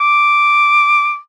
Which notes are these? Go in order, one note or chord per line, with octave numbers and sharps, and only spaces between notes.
D6